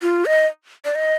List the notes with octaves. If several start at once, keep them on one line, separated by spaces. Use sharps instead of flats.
F4
D#5
D5
D#5